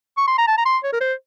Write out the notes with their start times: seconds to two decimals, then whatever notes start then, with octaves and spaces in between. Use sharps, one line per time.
0.17 C#6
0.28 C6
0.38 A#5
0.48 A5
0.58 A#5
0.66 C6
0.84 C#5
0.93 A#4
1.01 C5